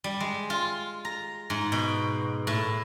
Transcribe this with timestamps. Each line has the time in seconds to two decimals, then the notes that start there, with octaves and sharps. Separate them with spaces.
0.04 G3
0.20 G#3
0.50 F4
1.05 A#5
1.50 G#2
1.72 B2
2.47 A2